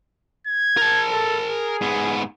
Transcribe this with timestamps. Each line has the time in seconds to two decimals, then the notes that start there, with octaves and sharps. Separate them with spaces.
0.47 G#6
0.77 A#4 A5
1.11 A4
1.47 G#4
1.81 G#2 B3